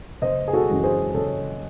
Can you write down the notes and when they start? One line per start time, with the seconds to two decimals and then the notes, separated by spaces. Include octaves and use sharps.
0.22 F#1 C5 D#5
0.48 G#4
0.53 F#4 A4
0.69 F#2 E3 G#3
0.83 G#4 C5
1.14 F#1 A4 C#5